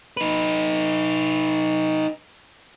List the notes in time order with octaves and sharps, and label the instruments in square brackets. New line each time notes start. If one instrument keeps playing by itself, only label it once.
[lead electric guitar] D#4 B4